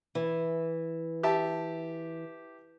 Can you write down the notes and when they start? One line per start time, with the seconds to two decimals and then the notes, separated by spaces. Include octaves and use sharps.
0.15 E3
1.23 G4 E5 A5